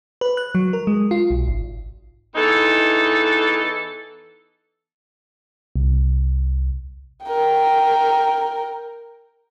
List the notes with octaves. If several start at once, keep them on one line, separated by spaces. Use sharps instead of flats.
B4
F#6
F#3
A#4
G#3
F4
B1
G#1
E2 E3 D#4 A4
C2
A#4 G5